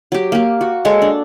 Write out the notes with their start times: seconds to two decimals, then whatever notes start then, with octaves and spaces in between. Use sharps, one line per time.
0.12 F#3 G4
0.32 A#3 G4
0.61 F#4
0.85 G#3 A4 C#5 C#6
1.02 D4